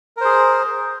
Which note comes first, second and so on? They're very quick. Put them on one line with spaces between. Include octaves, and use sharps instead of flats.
A#4 C5 G#4